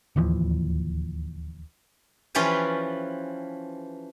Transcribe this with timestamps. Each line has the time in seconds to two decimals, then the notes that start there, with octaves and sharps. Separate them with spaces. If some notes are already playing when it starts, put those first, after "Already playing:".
0.16 D1 D#2 E3 F3
2.35 E3 F3 C#4 F4 G4 B4